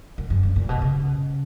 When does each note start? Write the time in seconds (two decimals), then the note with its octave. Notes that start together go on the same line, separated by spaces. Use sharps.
0.18 F#2
0.30 F#2
0.43 G2
0.56 A#2
0.69 B2
0.82 C#3